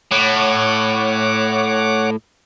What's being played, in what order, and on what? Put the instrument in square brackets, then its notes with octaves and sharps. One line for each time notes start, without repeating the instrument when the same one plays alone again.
[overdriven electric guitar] A2 [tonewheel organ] C#5 F#5 D6